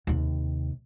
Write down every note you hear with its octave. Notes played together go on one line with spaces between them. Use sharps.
D#2 C3